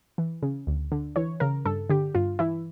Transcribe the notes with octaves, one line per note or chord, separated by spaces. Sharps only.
E3
C#3
D2
D3
E3 C#5
C#3 A#4
G2 A4
D3 G4
G2 F4
E3 E4